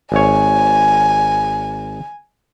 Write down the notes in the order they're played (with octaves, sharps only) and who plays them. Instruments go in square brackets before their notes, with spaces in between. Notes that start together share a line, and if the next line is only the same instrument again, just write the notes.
[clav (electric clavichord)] G#1 C#5 [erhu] G#5